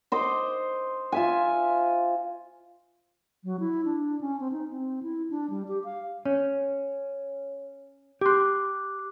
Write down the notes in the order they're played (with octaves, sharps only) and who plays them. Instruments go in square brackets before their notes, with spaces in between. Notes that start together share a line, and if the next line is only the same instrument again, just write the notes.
[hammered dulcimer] C5 D#5 D6
F4 E5 G#5
[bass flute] F#3
E4
D4
C#4
C4
D#4
C4
E4
D4
G3
G4
F5
[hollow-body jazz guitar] C#4 [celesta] C#5
[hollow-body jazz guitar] G4 C6 [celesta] D6 F#6